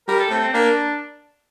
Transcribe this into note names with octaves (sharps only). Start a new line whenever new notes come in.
G3 A#4
A4
A3 C4
C4
A#3 D4